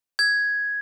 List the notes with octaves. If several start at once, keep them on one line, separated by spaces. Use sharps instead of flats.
G#6